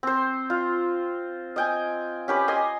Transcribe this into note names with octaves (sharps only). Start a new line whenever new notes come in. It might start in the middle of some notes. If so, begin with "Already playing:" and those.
C4 C5
F4
D#5 G5 G#5
C#4 G4 B4
D#5 G#5 C6